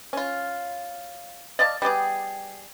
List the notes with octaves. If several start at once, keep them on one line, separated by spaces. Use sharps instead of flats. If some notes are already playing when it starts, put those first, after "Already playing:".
C#4 F4
D5 D#5 F5 A5
G3 B3 G4 G#4